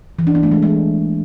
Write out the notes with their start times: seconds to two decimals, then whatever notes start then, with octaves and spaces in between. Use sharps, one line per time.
0.19 E3
0.27 D4
0.35 B3
0.43 A3
0.52 G#3
0.62 G#3